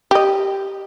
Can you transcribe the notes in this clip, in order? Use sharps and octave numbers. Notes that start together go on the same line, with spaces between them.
G4 D#5